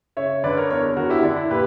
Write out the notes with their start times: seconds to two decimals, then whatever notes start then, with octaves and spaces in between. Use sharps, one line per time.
0.17 C#3 C#5 E5
0.44 D3 B4 D5
0.57 A#4 C#5
0.70 E2 A#4 C#5
0.96 D3 F#4 A#4
1.10 E4 G4
1.23 D3 D4
1.36 E4
1.50 A#2 G4 B4